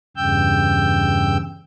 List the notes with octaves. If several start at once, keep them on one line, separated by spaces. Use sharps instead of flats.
E2 G2 C#3 G5 E6 G6